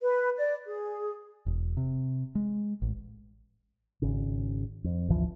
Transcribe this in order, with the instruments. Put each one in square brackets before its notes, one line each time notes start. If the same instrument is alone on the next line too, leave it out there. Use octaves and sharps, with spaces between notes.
[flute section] B4
D5
G#4
[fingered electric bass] E1
C3
G#3
A1
G#1 C#3
F2
G#1 D2 E3 F3